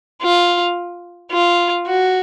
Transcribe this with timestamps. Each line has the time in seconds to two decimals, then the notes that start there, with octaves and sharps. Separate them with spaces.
0.22 F4
1.32 F4
1.87 F#4